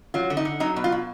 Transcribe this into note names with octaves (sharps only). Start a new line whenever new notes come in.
F#3 F4
D3
D#4
D3
F#3 D#4
B2
F4
B2